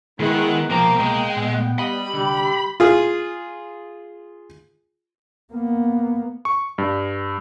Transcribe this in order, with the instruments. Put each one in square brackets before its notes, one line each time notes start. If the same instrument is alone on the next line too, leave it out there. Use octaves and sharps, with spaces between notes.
[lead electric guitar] D#3 [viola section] G#3 B3 F#5 [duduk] E4
[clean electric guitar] C2 B2 A#5 [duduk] F3 [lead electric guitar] A#3 [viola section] G5
[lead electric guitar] G#3 [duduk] A#3
[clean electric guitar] A#2 [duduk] B3
[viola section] G3 [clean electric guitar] D#5 [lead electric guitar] B5
[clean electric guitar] C2 D3 [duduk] G4
[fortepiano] F4 G#4
[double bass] A#3 B3
[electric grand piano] C#6
G2